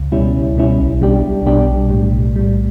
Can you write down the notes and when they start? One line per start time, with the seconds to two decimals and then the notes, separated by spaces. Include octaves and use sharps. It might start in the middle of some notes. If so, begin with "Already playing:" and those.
Already playing: C#2
0.12 B2 G3 C#4 E4
0.35 C#2
0.56 B2 G3 C#4 E4
0.79 B1
1.01 B2 G3 D4 G4
1.23 B1
1.46 B2 G3 D4 G4
1.69 B1
1.90 A2 G3
2.13 B1
2.36 A2 G3